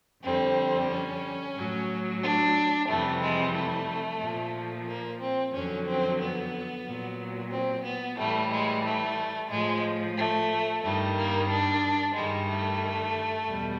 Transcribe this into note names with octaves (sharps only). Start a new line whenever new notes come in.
F2 D3 G3 C4
C#4
A2 F#3
D4
F2 C3 E3 G3 A3
G#3
A3
A#2 F3
A#3
C4
F2 D3 F#3 C#4
C4
B3
A#2 F#3
C4
B3
A2 E3 G3 A3
G#3
A3
A2 F3 G#3
A3
G2 D#3 G3 A3
A#3
D4
G2 D#3 G3 G#3
A3
E2 B2 G3